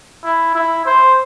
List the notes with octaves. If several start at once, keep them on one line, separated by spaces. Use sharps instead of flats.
E4
E4
C5